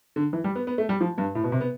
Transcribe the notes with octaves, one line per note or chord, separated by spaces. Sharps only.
D3
E3
G3
B3
B3
A3
G3
F3
G2
A2
B2
C3
B3